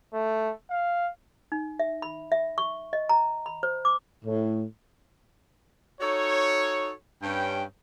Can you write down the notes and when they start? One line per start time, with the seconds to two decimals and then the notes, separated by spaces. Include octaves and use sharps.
0.13 A3
0.70 F5
1.52 D#4
1.80 E5
2.02 B5
2.32 E5
2.58 C#6
2.93 D#5
3.09 A#5
3.46 B5
3.63 C5
3.85 D6
4.25 A2
6.01 D#4 F#4 A4 C#5
7.23 G2 C#4 G5